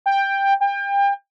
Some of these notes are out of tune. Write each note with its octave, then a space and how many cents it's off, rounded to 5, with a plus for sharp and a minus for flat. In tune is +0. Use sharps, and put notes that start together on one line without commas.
G5 +10
G5 +30